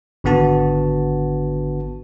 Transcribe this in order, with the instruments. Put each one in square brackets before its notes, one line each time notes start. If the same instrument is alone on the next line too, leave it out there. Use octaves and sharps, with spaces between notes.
[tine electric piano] G#1 D3 B3 F#4 A5